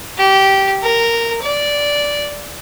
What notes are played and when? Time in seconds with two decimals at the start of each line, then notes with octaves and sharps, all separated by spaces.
0.18 G4
0.82 A#4
1.42 D5